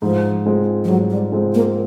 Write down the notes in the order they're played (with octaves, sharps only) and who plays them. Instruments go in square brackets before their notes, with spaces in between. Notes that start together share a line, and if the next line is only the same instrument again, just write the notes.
[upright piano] G#2 [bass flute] F3
[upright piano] F3 G#3 C4
[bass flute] F3
[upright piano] G#2 [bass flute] F#3
[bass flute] G3
[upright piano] F3 G#3 C4
[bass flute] A#3